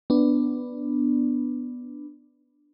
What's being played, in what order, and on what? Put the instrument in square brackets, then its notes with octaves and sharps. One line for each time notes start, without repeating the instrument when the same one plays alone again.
[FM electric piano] B3 D4